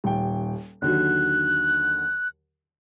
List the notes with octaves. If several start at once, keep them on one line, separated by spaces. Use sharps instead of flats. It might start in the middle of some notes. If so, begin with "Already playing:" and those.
D#1 G5
D#2 D3 F#3 F#6